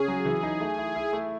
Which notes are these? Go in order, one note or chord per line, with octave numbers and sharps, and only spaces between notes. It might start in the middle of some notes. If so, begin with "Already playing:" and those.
Already playing: C#3 C#4 G#4
F#3
E3
D#4
A3
E4
E4
A3